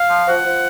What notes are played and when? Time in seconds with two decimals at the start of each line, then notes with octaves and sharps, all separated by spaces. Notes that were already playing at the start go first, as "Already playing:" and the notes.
Already playing: F5
0.09 F3
0.27 F3 F#5
0.45 F3